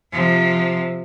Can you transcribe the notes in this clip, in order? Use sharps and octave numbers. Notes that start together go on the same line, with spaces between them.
C3 F3